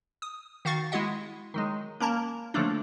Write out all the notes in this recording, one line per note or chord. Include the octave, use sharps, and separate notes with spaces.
D#6
D#3 F#4 F5 C#6 A6
G#3 E4 F#4 D#5 F#5
D#3 F#3 G#3
A#3 C#4 A#4 A5 A#5
D3 F3 F#3 A3 A#3 D4